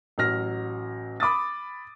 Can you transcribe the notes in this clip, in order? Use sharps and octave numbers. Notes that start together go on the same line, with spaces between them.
A1 F#3 F6 A#6
B5 D6 D#6 A6